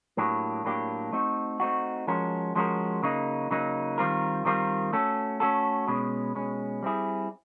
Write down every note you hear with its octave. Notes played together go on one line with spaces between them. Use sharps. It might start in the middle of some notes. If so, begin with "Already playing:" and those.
A2 F#3 A#3 D4 G4
A2 F#3 A#3 D4 G4
A3 C4 D#4 F#4
A3 C4 D#4 F#4
F3 G#3 C#4 F#4 A#4
F3 G#3 C#4 F#4 A#4
C#3 F#3 A#3 D#4
C#3 F#3 A#3 D#4
D#3 G3 C4 F4 A#4
D#3 G3 C4 F4 A#4
A3 C#4 F#4 A4
A3 C#4 F#4 A4
B2 G#3 C#4
B2 G#3 C#4
G3 C4 E4 G#4